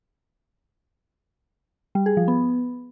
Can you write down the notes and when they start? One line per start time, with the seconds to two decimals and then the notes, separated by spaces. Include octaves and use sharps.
1.95 G3
2.06 G#4
2.17 F3
2.28 B3